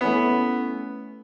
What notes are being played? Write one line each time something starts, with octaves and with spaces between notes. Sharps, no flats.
A3 B3 C#4 E4